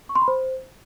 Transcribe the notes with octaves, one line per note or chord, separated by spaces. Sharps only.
C#6
C6
B5
C5